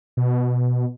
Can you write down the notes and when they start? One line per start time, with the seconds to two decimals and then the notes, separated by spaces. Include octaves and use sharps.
0.17 B2
0.70 B2